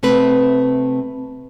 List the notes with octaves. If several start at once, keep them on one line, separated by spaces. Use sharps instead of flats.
C3 A3 C4 B4